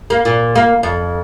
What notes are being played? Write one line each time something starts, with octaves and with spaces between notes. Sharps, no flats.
A#3
A#2
A#3
F2